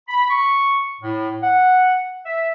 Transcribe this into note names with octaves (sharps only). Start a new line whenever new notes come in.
B5
C#6
A2
F#5
E5